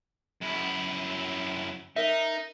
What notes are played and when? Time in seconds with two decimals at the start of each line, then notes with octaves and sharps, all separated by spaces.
0.42 F#2 E4
1.96 D#4 A#4 E5